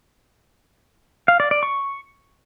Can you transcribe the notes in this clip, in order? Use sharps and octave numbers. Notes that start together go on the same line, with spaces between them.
F5
D5
D5
C#6